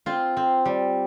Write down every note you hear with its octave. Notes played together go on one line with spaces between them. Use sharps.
C4 F4
C4
G3